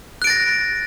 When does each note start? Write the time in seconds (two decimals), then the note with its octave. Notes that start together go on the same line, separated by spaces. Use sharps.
0.22 F#6
0.24 D7
0.27 A6
0.30 A#6